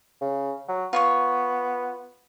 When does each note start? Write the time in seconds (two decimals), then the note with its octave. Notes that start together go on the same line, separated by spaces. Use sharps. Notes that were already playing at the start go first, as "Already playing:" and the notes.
0.21 C#3
0.68 F#3
0.93 B3 F4 C#5 C#6